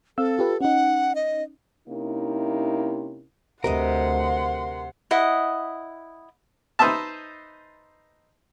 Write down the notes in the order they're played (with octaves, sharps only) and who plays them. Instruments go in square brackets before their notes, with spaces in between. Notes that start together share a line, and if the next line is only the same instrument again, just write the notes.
[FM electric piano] C4 F5 E6 [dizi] A4
[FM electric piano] F4 G4 B4
[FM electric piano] C#4 D#4 [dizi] F#5
[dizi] D#5
[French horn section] C3 A#3 C#4 D#4 E4
[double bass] D2 [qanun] C3 B4 D#5 [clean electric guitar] A#4 [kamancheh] F#5 C6
[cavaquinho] E4 D#5 F#5
[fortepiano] D#4 B4 C5 D#5 E5 A5